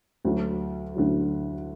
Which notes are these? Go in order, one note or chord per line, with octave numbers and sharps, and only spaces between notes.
D2 D3 F#3
D2 D3 F#3